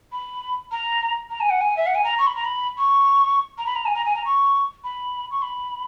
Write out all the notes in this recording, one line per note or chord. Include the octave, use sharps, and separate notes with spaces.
B5
A#5
A#5
G#5
F#5
G#5
E5
F#5
G#5
A#5
C#6
B5
A#5
B5
C#6
A#5
B5
A#5
G#5
A#5
G#5
A#5
C#6
B5
C#6
B5